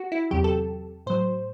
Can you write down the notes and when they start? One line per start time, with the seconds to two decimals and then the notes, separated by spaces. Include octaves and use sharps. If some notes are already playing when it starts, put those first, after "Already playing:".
Already playing: F#4
0.12 E4
0.31 E2 C3 F#3 G4
0.44 A4
1.06 A2 F#3 C5